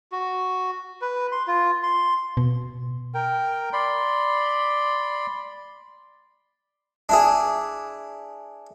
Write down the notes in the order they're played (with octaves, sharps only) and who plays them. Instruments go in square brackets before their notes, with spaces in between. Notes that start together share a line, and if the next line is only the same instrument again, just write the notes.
[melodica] F#4
B4
C6
F4
C6
[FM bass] B2
[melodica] A#4 G5
D5 B5 C6
[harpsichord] D4 E4 G#4